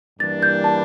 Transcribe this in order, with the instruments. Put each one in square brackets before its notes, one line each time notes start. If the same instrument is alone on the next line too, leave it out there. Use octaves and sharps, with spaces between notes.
[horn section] G2 E3 G3 A#3 D4 [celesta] A6
[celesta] G6
A5